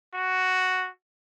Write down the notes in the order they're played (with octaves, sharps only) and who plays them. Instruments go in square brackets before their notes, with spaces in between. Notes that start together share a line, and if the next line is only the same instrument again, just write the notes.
[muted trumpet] F#4